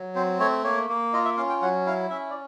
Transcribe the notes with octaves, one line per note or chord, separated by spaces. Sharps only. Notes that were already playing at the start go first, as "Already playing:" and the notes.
Already playing: F#3
C4 C5
A3 C#5
A#3 C#5
A#3
F4 D#5
E5
C#4 F5
G5
F#3 F#5
E4 F5
C#4 E5
D5